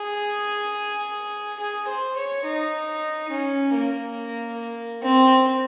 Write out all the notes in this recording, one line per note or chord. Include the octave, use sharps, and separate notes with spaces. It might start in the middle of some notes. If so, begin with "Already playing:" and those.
Already playing: G#4
G#4
C5
C#5
D#4
C#4
A#3
C4